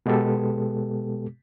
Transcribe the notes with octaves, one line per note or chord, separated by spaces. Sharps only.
B2 G#3 B3 G4 A4